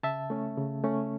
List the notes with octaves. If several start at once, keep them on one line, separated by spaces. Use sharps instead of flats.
C#3 E5 A5
A3 C#4
C#3
A3 C#4